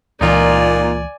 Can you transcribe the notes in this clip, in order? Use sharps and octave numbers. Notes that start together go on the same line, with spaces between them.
C#2 A#2 E3 D#4 F4 D5 G#5